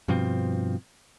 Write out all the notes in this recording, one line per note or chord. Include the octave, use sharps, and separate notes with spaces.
G2 B2 F3 C4